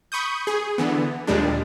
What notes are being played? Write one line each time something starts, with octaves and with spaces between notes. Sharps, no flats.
B5 C#6 D#6 G6
G#4
D3 E3 B3
D#2 A#2 G3 G#3 D4